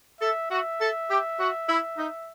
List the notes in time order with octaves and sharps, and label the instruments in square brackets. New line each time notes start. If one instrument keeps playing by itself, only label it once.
[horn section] A4 [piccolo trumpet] E5
[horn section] F#4 [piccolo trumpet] E5
[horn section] A4
G4
F#4
E4
D#4